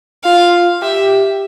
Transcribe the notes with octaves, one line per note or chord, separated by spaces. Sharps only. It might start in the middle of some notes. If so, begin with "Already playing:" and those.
F4 F5
G4 E5